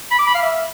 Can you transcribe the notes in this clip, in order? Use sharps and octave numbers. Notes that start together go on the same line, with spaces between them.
B5
D6
B5
F5
E5